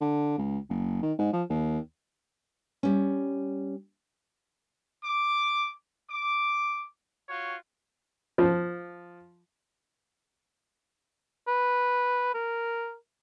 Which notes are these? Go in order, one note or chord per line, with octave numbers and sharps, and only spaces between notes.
D3
C#2
F#1
D#3
G#2
F3
D#2
G3 C#4
D6
D6
F4 F#4 C#5
F3
B4
A#4